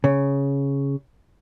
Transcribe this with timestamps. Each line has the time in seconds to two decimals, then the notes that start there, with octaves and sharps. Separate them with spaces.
0.04 C#3